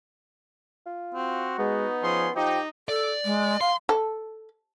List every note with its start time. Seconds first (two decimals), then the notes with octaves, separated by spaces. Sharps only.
0.86 F4
1.15 C4 F#4
1.58 G#3 B3 D#4
2.03 F3 C#4 G#4 C6
2.36 F3 D#4 G4 G5
2.89 A4 D5
3.25 G#3
3.61 F5 C6
3.89 A4